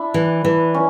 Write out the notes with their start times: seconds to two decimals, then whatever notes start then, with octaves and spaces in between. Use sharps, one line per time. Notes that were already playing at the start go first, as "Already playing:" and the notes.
Already playing: D4 E4
0.14 E3
0.45 E3
0.74 C#4